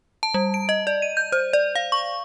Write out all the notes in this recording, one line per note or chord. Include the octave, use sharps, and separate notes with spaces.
A5
G3
D7
D#5
D5
D#7
G6
C5
D5
F5
C#6